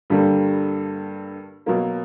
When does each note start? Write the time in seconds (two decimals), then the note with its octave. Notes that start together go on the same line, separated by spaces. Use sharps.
0.10 G2 D3 G3 A#3
1.66 B2 F#3 A#3